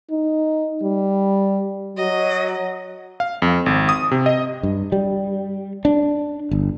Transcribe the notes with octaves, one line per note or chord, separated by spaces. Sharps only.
D#4
G3
F#3 D#5
F5
F2
G#1
D#6
C3
D#5
G2
G3
D4
G1